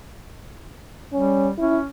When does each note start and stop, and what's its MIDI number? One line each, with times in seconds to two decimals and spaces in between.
1.13 1.53 55
1.13 1.48 61
1.58 1.87 61
1.58 1.78 64